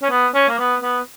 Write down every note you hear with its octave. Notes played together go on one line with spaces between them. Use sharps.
C#4
B3
C#4
A#3
B3
B3